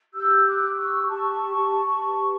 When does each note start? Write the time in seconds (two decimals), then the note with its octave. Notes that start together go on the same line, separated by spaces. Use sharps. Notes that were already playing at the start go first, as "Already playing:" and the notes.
0.14 G4 E6 G6
0.46 D6 F#6
0.63 G4
0.78 C#6 E6
1.09 G4 A5 C#6
1.57 G4
2.04 B4